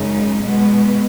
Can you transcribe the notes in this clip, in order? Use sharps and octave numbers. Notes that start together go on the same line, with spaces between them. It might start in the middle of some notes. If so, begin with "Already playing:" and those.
Already playing: F#2 C#3 G#3 D#4
B2 G#3 B3